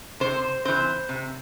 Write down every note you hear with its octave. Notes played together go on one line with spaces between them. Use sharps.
C3 C5
E3 C4 C5
C3